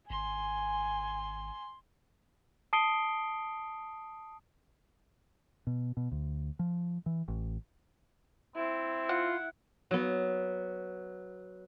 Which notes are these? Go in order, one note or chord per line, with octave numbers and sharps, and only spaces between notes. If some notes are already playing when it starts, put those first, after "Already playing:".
G#1 G#5 C6
A5 D#6 C7 D7 G7
B2
B2
D2
F3
E3
A1
C4 E4
F4 F#5
F#3 B3